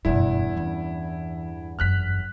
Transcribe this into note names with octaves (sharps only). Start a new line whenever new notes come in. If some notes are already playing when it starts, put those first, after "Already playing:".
F#1 E2 G2 B2 E4
E3 C#4
G1 F#2 F6 F#6 B6